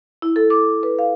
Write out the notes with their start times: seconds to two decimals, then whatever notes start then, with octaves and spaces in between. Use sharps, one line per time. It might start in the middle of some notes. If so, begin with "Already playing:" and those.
0.22 E4
0.36 A4
0.50 D6
0.83 B4
0.99 F5